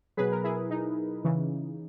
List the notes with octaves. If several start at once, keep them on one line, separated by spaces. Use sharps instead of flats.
B2 F#3 G#4 B4
A#4
E4 G#4
D#4
C#3 E3